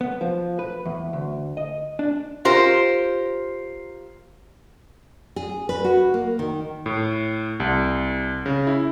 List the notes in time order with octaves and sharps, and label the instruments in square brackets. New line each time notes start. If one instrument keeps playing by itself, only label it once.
[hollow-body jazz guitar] B3
F3
B4
E2
D2
D#5
D4
[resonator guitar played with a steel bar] F4 G4 A#4 C5
[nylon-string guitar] G#4
B4
F#4
A#3
D#3
[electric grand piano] A2
C2
C#3
E4